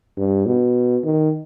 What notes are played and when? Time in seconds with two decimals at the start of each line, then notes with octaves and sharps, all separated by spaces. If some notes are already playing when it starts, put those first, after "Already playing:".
0.17 G2
0.46 B2
1.04 D#3